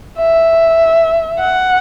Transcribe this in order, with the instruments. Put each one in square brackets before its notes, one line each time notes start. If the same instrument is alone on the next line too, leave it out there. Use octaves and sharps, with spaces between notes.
[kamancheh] E5
F#5